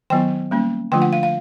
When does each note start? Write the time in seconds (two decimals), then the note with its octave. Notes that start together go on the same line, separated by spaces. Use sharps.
0.10 D#3 F#3 B3 E4 G5
0.51 G3 A#3 C#4
0.92 D3 F3 A3 D4 F4 G5
1.02 F#5
1.13 F5
1.23 F5